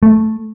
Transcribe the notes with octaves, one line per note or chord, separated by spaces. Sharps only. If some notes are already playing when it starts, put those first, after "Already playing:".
A3